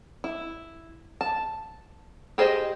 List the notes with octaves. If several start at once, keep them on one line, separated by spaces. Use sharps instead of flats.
E4
A5
G4 G#4 C5 D#5